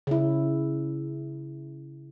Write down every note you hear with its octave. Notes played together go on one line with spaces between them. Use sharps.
C#3 E4